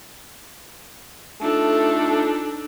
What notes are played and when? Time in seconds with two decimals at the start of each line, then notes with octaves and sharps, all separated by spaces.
1.41 A3 D4 D#4 F4 A4